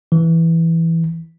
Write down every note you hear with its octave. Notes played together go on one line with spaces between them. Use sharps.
E3